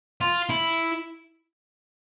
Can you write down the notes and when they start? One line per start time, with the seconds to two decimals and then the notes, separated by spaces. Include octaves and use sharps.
0.21 F4
0.49 E4